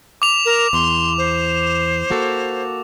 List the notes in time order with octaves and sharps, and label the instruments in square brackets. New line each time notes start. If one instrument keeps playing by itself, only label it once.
[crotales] D6 F7
[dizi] A#4
[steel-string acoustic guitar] E2 [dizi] C6
[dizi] C5
[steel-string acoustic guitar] A#3 F#4 A4